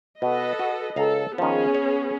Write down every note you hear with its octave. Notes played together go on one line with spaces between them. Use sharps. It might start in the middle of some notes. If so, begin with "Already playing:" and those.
B2 A4 B4 D#5
F#4
C#2 A4 F5 A#5
D#3 F3 B3 C#4 G#4
C#5